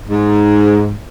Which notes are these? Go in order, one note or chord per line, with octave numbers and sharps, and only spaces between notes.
G#2